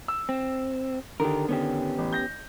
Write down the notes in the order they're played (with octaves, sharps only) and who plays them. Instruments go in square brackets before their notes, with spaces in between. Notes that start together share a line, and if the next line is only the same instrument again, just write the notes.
[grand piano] E6
[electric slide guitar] C4
[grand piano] D3 D#3 [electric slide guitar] G4 A#4
[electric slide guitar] B3 C#4 G4
[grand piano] A1
G6 A#6